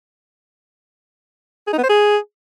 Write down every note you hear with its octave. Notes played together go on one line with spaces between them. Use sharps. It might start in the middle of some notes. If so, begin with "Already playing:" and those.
G#4
D#4
B3
C5
G#4